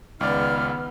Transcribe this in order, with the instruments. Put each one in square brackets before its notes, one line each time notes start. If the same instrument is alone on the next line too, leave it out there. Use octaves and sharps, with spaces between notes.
[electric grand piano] C#2 D5 [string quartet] D#3 B3 [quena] F6